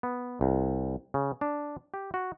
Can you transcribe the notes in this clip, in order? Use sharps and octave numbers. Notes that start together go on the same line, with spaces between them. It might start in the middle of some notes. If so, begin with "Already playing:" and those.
B3
C2
C#3
D4
G4
F#4